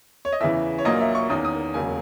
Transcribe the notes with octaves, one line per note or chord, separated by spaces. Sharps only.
C#5
D#5
E2 C#3 E3 E5
C#5
A#1 A#2 F#3 A#3 D#5
E5
C#6
E2 D#3 A#3 C#4 D#6
D#6
E1 D#2 C#3 F#3 G#5